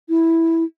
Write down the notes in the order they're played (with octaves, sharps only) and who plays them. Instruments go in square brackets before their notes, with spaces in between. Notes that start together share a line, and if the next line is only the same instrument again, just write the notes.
[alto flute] E4